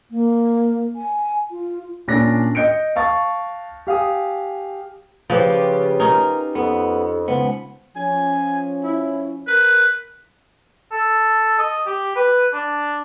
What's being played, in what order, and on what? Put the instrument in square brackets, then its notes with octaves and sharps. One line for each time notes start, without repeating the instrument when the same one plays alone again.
[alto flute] A#3
G#5
F4
[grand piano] A#2 C#4 D4 D5 A#6
D#5 G6 C#7 D7
F5 A5 C#6 A6
G4 F5 G#5 D#6
[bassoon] C#3 [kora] F3 [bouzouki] F4 G4 B4
[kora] C#4 D#4 [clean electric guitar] A#4
[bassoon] F2 [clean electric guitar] B3
[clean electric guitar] C#2 B3 [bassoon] F3
[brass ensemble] F3 C#4 [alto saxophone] G#5
[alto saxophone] E4
[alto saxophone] A#4 [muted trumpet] B4
[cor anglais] A4
D#5
G4
B4
D4